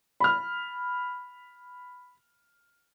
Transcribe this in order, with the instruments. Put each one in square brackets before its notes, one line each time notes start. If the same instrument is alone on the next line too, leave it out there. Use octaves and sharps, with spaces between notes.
[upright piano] B5 F6